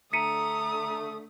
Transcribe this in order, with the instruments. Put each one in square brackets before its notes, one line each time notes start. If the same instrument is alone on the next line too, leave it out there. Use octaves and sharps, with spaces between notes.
[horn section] D3 A3 [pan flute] A#5 [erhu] D#6 [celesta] B6 C#7 D#7